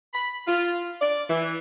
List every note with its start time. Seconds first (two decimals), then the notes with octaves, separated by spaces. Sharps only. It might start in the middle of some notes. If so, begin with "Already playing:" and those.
0.14 B5
0.47 F4
1.01 D5
1.30 E3